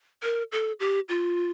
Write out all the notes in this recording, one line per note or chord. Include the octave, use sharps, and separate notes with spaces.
A#4
A4
G4
F4